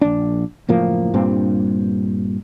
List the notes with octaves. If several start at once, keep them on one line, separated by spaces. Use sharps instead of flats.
A#1 D4
F#1 A2 F3 A#3
G2 A#2 C4